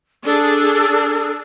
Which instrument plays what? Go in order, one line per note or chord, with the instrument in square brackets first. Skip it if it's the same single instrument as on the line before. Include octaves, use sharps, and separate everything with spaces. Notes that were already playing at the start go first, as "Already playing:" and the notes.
[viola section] D4 G#4 [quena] A4